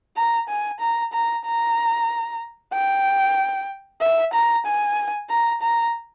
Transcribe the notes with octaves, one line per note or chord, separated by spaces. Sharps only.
A#5
G#5
A#5
A#5
A#5
G5
E5
A#5
G#5
A#5
A#5